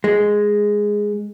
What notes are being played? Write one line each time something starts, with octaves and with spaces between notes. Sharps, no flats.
G#3